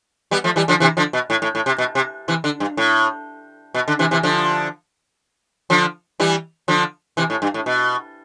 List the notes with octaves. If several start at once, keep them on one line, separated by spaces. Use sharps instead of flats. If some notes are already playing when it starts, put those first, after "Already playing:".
G3 B3
F3 A3
E3 G3
D3 F3
C3 E3
D3 F3
B2
A2
A2
A2
C3
B2
C3
C3 E3
D3
G2
A2
B2
D3
C3 E3
C3 E3
D3 F3
D3 F3
E3 G3
D3 F3
C3 E3
A2
G2
A2
B2